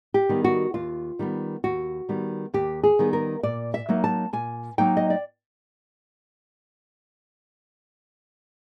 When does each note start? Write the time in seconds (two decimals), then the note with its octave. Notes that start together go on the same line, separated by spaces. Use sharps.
0.14 G4
0.29 D#3 G3 B3
0.44 F#4
0.74 D#2 F4
1.19 D#3 G3 B3
1.64 D#2 F#4
2.09 D#3 G3 B3
2.54 D#2 G4
2.83 G#4
2.99 D#3 G3 B3
3.13 A#4
3.43 A#2 D5
3.74 E5
3.89 F#3 A#3 D#4
4.04 A5
4.33 A#2 G#5
4.78 F#3 A#3 D#4 G5
4.97 D#5
5.10 D5